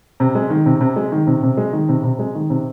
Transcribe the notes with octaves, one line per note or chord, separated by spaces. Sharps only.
C3
G#3
D#3
C3
C3
G#3
D#3
C3
C3
G#3
D#3
C3
C3
G#3
D#3
C3